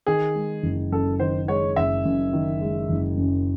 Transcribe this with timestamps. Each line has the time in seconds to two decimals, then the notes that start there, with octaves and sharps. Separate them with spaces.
0.07 D#3 G#4
0.35 G#3
0.63 F#1
0.92 F#2 A4
1.19 D#3 C5
1.48 G#3 C#5
1.76 F#1 E5
2.05 F#2
2.33 D#3
2.61 G#3
2.90 F#1
3.18 F#2